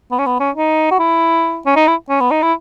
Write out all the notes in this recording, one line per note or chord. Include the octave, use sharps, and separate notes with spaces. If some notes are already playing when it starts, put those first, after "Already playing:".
B3
C#4
B3
C#4
D#4
F#4
E4
C#4
D#4
E4
C#4
B3
D#4
E4